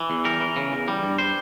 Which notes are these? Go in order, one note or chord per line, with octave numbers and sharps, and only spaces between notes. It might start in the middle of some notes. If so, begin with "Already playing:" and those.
Already playing: E3
E2
G3 A#4
E3
C#3
E2
G3
G2
G3 C5